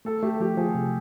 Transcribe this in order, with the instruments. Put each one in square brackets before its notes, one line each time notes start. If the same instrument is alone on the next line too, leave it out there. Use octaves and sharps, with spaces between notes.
[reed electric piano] A3 [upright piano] A4
[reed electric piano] A3 [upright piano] G4
[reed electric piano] F3 [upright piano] G4
[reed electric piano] F3 [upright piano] G#4
[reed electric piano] C3